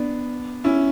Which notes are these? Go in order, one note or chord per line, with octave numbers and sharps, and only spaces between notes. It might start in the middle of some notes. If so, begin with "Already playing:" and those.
Already playing: B3 D4
C#4 E4